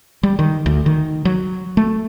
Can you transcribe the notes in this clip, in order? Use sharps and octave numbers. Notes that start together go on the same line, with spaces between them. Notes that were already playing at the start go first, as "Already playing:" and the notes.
G3
D#3
D2
D#3
F#3
A3